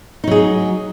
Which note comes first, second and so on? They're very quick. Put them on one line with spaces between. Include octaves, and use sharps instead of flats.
D#4 F#3 G#4